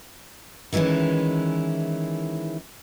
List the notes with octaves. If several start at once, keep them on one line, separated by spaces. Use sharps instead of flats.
D#3 E3 G#3 C#4 E4